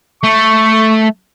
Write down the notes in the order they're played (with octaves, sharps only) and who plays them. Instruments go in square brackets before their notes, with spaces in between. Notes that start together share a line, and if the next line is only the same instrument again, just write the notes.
[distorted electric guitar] A3 [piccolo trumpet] C#6